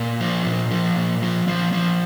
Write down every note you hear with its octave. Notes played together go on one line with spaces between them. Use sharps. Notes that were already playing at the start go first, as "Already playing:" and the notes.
Already playing: A#2 A#3
F3
A#2
F3
A#2
F3
F3
F3